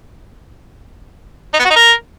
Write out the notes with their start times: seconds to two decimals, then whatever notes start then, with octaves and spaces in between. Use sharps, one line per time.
1.54 D#4
1.59 B3
1.65 F#4
1.70 D#4
1.76 A#4